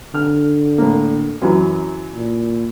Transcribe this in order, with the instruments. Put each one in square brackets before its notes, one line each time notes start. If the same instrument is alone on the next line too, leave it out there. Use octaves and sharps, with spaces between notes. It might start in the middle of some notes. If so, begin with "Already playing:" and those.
[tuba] D3 [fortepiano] F6
[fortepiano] A2 A#3
F#2 E3 F#3
[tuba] A#2